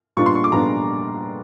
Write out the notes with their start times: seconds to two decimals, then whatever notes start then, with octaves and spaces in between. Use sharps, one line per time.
0.17 A#2 G3 B3 D4 F4 C#6
0.26 C6
0.35 C#6
0.44 D6
0.52 A#2 G3 B3 D4 F4 A#5